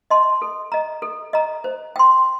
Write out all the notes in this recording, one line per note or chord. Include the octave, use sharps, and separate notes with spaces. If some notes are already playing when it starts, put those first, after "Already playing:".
D#5 A5 C6
A4
D#5 A#5
A4
D#5 A#5
C5
G5 C6